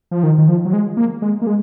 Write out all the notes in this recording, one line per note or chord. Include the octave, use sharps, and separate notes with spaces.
F3
D#3
D#3
F3
F#3
G#3
A#3
G#3
A#3
G#3